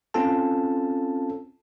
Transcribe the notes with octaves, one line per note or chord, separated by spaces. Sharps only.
C4 C#4 F4 A4 A5